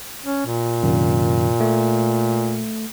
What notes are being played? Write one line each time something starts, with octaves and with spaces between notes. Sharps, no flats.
C#4
A#2
F#2 C3 D#3
A3